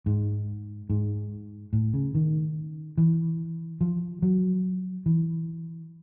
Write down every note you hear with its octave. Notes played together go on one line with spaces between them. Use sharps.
G#2
G#2
A2
C#3
D#3
E3
F3
F#3
E3